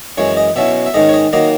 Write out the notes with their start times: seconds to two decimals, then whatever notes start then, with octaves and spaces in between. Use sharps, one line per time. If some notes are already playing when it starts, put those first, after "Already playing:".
0.18 F#2 E3 G#3 C#5
0.37 D#5
0.56 B2 F#3 C#4 E4 E5
0.86 E5
0.94 G#2 D#3 G#3 C#4 D#5
1.09 C#5
1.13 D#5
1.33 D#3 F#3 A#3 D#5